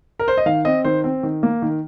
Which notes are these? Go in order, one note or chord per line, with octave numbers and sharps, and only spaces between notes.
A#4
C5
D#5
D#3 F5
C4 D#5
D#3 C5
C4
D#3
A#3
D#3